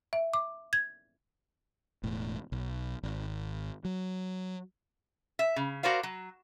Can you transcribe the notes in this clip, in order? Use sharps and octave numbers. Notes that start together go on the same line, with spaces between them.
E5
D6
G#6
E1 A2
B1
G#1
F#3
E5
C#3
F#4 A#4 C5 D5 F5
F#3